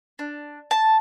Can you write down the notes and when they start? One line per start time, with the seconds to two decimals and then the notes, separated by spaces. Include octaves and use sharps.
0.19 D4
0.71 A5